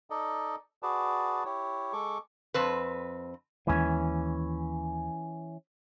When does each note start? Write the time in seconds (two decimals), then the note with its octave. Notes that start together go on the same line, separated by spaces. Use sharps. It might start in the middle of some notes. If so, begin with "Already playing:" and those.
0.10 D#4 A4 D5 D#5
0.83 F#4 G#4 B4 D5 A5
1.45 E4 G4 C#5
1.93 G#3 A4 C#6 D6
2.54 F2 C4 B4
3.67 D#2 E3 G#3 C#4